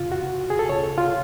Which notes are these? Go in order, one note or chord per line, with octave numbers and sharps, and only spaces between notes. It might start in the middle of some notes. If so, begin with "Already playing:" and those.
Already playing: F2 C#3 F4
F#4
G#4
A4
D2 C#3 C#5
F4